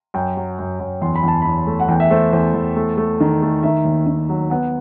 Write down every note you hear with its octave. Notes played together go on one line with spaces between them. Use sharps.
F#2 G5
F#3
F#2
F#2
E2 C6
B5
E2 A5
E2 B5
A3
F#5
E2 G5
E5
A3 C5
E2 C5
E2
A3
A3
D#3
A3
D#3 E5
D#2
D#3
F#3
B3 F#5